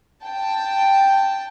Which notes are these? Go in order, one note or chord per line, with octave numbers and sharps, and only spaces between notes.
G5 A5